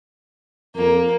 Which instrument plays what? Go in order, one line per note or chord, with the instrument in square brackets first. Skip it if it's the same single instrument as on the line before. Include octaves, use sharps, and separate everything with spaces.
[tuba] F2 [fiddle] A#3